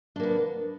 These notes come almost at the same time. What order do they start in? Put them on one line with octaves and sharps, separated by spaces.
D4 A#3 B3